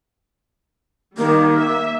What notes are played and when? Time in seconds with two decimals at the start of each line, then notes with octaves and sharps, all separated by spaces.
1.17 D#3 G3 A#3
1.57 E5